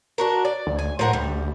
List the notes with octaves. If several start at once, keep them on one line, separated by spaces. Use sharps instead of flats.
D4 F#4 A#4
D5
D2
G#5
A2 F3 A#4 F#5
D2 G3